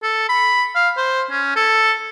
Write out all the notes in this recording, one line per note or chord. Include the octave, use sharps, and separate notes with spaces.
A4
B5
F5
C5
C#4
A4